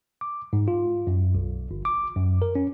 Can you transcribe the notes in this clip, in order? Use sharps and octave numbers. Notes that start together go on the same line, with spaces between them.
D6
G#2
F4
F#2
B1
G1
D6
F#2
A#4
C#4